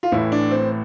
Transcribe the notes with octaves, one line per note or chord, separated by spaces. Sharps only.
F4
A1 A2 E3 E4
D4
C4